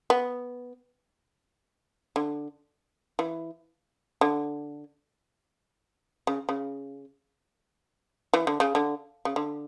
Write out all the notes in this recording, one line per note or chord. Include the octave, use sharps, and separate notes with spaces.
B3
D3
E3
D3
C#3
C#3
E3
D3
C#3
D3
C#3
D3